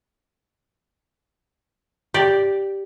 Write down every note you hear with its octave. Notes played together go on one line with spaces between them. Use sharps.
G4 D5